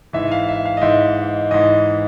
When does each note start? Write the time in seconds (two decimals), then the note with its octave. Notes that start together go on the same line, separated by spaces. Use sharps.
0.13 G#2 E3 E5
0.32 F5
0.49 E5
0.66 F5
0.77 D#5
0.82 G#2 E3 E5
1.51 G#2 E3 D#5